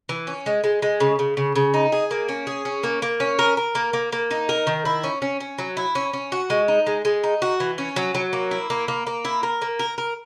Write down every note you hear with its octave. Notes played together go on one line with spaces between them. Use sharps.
E3
C#4
G#3
G#3
G#3
C#3
C#3
C#3
C#3
D#4
G#4
A#3
C#4
G#4
C#4
A#3
A#3
C#4
A#4
A#4
A#3
A#3
A#3
D#4
A#4
D#3
E4
C#4
C#4
C#4
F#3
E4
C#4
C#4
F#4
G#3
D#4
G#3
G#3
D#4
F#4
E3
C#4
F#3
F#3
A#3
E4
A#3
A#3
A#3
E4
A#4
A#3
A#4
A#4